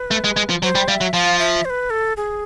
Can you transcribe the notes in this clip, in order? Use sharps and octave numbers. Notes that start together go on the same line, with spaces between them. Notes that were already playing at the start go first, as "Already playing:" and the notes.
Already playing: B4
A3
G#3
G#3
F3
F#3 C5
G3
G3 F5
E5
F#3
F3 F5
E5
C5
B4
A4
G#4